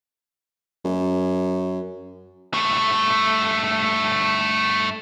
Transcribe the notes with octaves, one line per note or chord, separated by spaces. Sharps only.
F#2
G2 A3